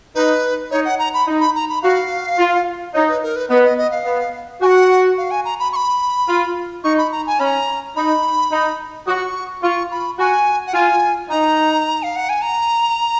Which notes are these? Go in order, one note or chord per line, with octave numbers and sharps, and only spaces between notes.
D#4 B4
D#4 C#5
F#5
A#5
B5
D#4
B5
A#5
B5
F#4 F5
F4
D#4 C#5
B4
A#4
B4
B3 D#5
D#5
D#5
F5
B3
F#4 F#5 G#5
F5
G#5
A#5
B5
C#6
B5
F4
D#4 C#6
B5
A#5
G#5
C#4 A#5 B5
D#4 B5
D#4
F#4 C#6 D#6
F4 C#6
B5
F#4 G#5
F#5
F4 G#5
D#4 A#5
F5
F#5
G#5
A#5